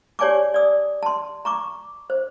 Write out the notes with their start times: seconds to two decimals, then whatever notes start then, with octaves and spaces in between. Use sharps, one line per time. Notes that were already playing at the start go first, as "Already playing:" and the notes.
0.19 G4 C#5 D5 G#5 A5 D6
0.54 D5 D#6
1.03 A5 C6
1.45 A#5 C#6 D6
2.10 C5